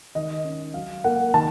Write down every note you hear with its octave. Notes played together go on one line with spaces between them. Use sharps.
D#3 D#5
C#4
F#3 F5
A#3 F#5
D#3 A5